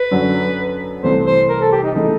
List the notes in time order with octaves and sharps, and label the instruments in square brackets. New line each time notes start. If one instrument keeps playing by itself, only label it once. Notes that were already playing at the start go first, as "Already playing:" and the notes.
Already playing: [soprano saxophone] B4
[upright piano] F#2 D3 F#3
[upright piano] C2 C3 E3 A3 [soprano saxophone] C5
[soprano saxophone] C5
A#4
A4
G4
D#4
[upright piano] C#3 E3 A3 [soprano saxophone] D#4